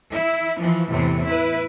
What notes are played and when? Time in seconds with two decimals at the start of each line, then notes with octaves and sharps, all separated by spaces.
0.10 E4
0.58 E3 F3
0.91 E2 A2 C3 E3
1.24 E4 B4